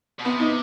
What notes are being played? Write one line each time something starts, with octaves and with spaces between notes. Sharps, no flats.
B2
C3 B3
D#4